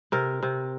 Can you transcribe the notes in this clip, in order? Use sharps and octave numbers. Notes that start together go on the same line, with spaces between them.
C3 A#4
C3